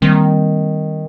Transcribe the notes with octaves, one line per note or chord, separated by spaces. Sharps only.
D#3 G3 A#3 C4